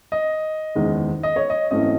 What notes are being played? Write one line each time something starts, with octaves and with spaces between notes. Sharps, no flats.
D#5
F#1 E2 D#3 G#3
D#5
C#5
D#5
G#1 F#2 E3 A3 C#4 D#5